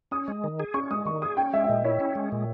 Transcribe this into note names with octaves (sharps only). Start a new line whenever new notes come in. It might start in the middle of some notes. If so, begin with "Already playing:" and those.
C#4 D#6
G#3
D#3
G#4
C#4 C#6
G#3 D#6
D#3 C#6
G#4 D#6
C#4 G5
G#3 E5
E5
A#2 D#5
E4 C#5
C#4
G#3
A#2